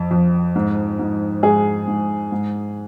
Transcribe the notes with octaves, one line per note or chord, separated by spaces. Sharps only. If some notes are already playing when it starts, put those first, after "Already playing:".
Already playing: F2
F2
G#2
G#2
G#2 G#4
G#2
G#2